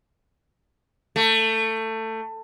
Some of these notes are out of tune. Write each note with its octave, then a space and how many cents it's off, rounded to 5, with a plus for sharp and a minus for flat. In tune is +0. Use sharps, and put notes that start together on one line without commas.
A3 +20